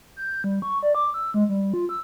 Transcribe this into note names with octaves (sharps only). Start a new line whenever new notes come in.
G6
G3
C#6
D5
D6
E6
G#3
G3
F4
E6